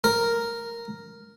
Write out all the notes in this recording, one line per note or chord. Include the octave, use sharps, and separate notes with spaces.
A#4